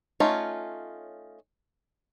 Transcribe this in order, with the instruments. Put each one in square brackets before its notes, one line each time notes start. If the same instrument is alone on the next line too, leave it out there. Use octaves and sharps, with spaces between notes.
[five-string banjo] A3 C#4 D#4 F4 C#5